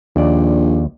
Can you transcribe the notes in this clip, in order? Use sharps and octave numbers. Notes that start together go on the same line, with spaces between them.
A#1 D#2 D5